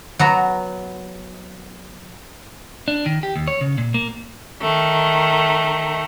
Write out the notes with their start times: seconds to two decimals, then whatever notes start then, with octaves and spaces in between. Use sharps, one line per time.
0.19 F#3 B3 A#5
2.88 D4
3.06 D#3
3.23 G4
3.36 D#2
3.48 C#5
3.61 C#3
3.78 A#2
3.94 A#3
4.62 D#3 A3